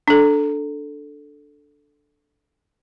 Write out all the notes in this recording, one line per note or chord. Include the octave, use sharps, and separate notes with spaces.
D4 A4